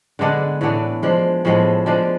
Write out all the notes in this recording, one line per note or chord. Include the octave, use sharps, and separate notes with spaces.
D3 G#3 B3 D4
A2 E3 B3 D4
F3 G#3 D4
A2 F3 G#3 B3
F3 G#3 D4